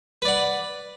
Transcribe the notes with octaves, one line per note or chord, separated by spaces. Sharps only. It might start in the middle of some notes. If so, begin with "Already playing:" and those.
B4 D5 F#5